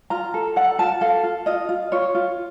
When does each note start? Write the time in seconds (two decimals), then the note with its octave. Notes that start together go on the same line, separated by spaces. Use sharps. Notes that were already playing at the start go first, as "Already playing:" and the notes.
0.10 F4 A#5
0.34 A4
0.56 A4 F#5
0.79 F4 A5
1.01 A4 F5
1.23 F4
1.46 F4 D#5
1.69 F4
1.92 F4 C#5
2.15 F4